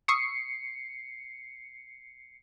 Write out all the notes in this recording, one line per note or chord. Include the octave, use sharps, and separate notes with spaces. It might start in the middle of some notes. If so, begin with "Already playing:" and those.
C#6 D#6 E6 C7 C#7